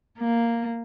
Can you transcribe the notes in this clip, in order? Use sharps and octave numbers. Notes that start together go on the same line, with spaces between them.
A#3